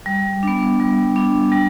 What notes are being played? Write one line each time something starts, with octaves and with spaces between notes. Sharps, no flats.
G3
B3 D4
G3
B3 D4
G3